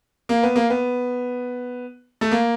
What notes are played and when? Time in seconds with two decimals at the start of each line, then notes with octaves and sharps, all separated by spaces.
0.29 A#3
0.43 B3
0.56 A#3
0.70 B3
2.21 A3
2.31 A#3